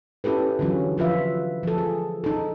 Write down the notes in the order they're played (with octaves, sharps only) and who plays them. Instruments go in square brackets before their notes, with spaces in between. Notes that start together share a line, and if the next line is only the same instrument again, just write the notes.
[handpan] C#4 E4 G4 A4 B4
D3 E3 F#3 C#4 F4
F3 F4 B4 E5
F3 A4
G#4
D#4 A4